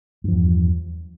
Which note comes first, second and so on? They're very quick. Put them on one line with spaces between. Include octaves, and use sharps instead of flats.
G2 F3 E2